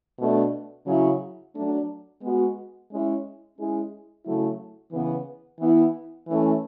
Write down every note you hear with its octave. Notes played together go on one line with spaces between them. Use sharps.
B2 A3 D4
C#3 F#3 C#4 E4
F#3 A3 D4
G#3 B3 F#4
G#3 C#4 E4
G#3 C#4 E4 G#4
C#3 F#3 A3 E4
C#3 E3 B3
E3 B3 E4
E3 A3 C#4